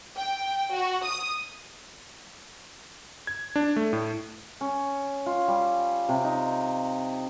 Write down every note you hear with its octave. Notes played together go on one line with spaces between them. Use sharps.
G5
F#4
D#6
G#6
D4
A3
A2
C#4
F4
G3
C3
D#4